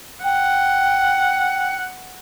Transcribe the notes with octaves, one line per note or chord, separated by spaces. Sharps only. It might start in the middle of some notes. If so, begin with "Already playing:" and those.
F#5 G5